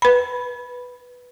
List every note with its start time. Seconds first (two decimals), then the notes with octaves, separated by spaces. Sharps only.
0.02 B4 B5